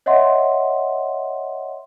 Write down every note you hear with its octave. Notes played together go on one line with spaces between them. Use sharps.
C#5 D#5 E5 F#5 C6